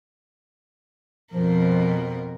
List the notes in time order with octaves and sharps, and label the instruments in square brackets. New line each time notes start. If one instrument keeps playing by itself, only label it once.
[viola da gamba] F2 B2 A#4 [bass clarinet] F3